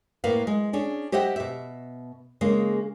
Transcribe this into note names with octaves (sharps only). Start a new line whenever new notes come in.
A2 A#3 B4 F5
G#3
C#4 D4 G#4
G4 C5 D#5 E5 F#5 G5
B2 E5
C#3 G#3 A#3